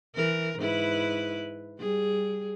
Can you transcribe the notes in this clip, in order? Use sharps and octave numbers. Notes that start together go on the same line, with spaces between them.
E3 A#4
G#2 E4 B4
G3 G#4